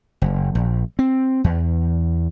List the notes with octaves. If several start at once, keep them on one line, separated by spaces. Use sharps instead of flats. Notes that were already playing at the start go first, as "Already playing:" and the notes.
F#1
A#1
C4
E2